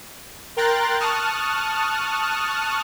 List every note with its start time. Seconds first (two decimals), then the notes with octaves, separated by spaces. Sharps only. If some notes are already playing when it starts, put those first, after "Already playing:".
0.57 A#4 G5 A#5 C6 F#6 A6
1.00 A5 C#6 D#6 F6 F#6